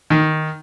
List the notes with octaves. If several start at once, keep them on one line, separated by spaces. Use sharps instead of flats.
D#3